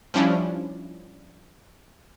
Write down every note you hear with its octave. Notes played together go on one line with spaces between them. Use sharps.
F3 G3 C#4 D4 E4